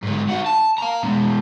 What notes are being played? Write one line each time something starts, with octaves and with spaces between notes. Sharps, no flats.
G#2 D3
D#4 F#4
A5
F5 A#5
B2 G#3